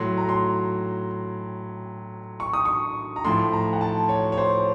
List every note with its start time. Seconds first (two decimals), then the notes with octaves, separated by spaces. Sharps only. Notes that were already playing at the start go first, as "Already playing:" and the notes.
Already playing: A2 F#3 C6
0.17 A#5
0.29 C6
2.40 C#6
2.53 D#6
2.65 C#6
3.16 A#5
3.25 A2 F3 C6
3.53 A#5
3.73 F#5
3.81 A5
4.09 C#5
4.32 C#5
4.38 C5